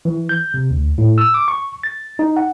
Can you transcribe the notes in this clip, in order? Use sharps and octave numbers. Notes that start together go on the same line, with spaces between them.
E3
G6
C3
D2
A2
E6
D6
C#6
A6
D#4
F#5